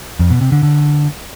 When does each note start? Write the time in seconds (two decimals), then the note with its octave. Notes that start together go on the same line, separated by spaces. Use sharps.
0.19 F2
0.30 B2
0.41 C3
0.52 D3
0.63 D3